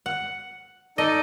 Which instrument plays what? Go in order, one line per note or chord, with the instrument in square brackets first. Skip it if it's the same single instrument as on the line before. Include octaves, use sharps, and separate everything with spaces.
[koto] F#5
[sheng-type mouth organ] D#4 A4 D5 [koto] D#5